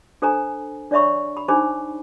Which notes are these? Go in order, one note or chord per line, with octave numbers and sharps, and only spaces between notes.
D4 A4 C5 G#5 A#5
D4 C#5 D5 E5 B5 C#6
B5
D4 D#4 G#4 C5 G#5 B5